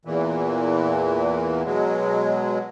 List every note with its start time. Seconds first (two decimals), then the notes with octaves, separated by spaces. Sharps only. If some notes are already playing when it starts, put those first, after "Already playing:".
0.05 E2 A#2 E3
1.65 B2 F#3 G#3